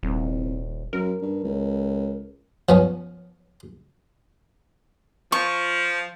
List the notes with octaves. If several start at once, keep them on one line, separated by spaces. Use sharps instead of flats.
D#1 C2
F#2 A#4
G2
C#2
F3 B3 C#4
F3 C#6